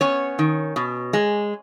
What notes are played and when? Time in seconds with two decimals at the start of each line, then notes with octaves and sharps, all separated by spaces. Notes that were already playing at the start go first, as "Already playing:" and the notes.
0.01 B3 C#4 C#5
0.39 D#3
0.76 B2
1.13 G#3